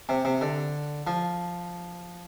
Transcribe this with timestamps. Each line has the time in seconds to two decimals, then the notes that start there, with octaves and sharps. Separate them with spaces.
0.09 C3
0.25 C3
0.41 D3
1.07 F3